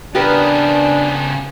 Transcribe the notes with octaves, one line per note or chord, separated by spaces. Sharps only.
C#3 B3 D4 G4 A#4 B4